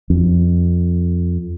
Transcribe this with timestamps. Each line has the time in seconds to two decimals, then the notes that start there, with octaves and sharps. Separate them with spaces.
0.10 F2